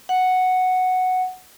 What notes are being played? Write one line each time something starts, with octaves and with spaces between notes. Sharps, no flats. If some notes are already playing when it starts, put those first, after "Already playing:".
F#5